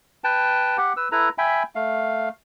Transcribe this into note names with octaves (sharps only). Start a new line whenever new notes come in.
B4 G5 A5
G4 F#5
B4 E6
E4 A4 B4 A#5
E5 G5 G#5 B5
A3 F5